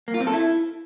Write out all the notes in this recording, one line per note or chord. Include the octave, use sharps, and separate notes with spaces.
A#3
F4
C4
A4
E4